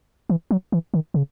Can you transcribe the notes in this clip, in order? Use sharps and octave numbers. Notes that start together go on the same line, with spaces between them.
E3
F#3
E3
D#3
C#3